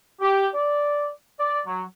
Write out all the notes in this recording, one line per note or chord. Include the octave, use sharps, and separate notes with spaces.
G4
D5
D5
F#3